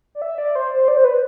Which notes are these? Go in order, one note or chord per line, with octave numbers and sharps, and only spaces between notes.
D5
E5
D5
C5
C5
D5
C5
B4